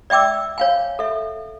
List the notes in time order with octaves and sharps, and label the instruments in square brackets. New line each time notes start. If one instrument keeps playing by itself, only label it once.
[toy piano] D5 E5 G5 D6 E6
C#5 F5 G#5
A4 E5